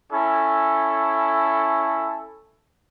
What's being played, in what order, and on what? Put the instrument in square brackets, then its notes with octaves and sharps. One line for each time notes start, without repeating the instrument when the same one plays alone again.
[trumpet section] C#4 E4 A4